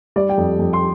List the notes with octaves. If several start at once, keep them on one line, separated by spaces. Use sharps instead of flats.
G3 D5
G5
F2
F2
C6